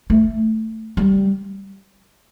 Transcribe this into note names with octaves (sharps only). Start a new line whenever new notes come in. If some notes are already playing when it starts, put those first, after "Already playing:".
A3
G3